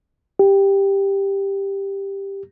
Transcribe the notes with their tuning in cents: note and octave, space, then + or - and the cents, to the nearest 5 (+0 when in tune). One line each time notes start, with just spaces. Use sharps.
G4 +5